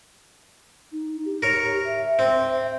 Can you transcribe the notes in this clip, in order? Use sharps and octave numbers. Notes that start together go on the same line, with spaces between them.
D#4
G4
A#4 C#5
E5
C4